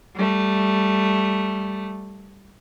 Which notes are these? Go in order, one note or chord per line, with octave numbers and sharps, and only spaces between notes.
G3 A3